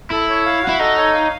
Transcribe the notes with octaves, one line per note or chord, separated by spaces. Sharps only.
E4 A4
C#5
F5
F#4
E4
D#4 A4
C#5
F5